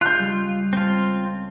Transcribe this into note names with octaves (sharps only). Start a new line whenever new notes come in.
F4 F#6 G6
C#2 G3
C4 F4 A4